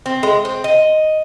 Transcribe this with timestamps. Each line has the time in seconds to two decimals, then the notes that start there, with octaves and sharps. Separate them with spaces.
0.06 C4
0.23 G#3
0.45 C4
0.64 D#5